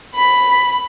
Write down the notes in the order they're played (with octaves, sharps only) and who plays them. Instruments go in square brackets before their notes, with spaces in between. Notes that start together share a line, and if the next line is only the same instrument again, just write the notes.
[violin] B5